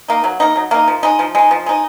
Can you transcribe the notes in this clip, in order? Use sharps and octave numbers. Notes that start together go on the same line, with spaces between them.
A#3 D#4
F#3
A#3 D#4
F#3
A#3 D#4
F3
G#3 D#4
F3
G#3 D#4
F3
G#3 D#4